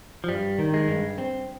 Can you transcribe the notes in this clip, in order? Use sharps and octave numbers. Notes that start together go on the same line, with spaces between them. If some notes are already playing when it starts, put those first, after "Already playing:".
F3
G2 G3
D#3
G#3
G2
C4